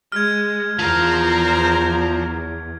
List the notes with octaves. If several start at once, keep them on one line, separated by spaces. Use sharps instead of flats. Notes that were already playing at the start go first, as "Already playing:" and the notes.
G#3 F6 G#6
E2 F3 A#4 C5 F5